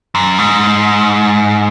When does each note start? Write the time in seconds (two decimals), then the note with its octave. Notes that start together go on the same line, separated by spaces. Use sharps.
0.15 F#2
0.38 G#2